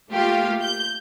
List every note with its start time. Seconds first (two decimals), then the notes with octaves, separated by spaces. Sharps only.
0.12 A3 A#3 F4 G4 F5
0.62 G6